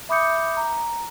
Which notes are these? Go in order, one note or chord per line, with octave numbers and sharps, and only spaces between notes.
E5 B5 D6 D#6 G6 C#7
A#5